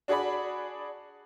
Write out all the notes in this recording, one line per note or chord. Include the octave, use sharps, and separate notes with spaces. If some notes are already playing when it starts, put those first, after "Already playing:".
D4 F#4 G#4 D5 B5